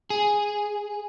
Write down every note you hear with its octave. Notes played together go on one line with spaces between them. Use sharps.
G#4